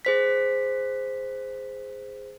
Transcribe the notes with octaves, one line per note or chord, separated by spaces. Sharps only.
G#4 C5 B6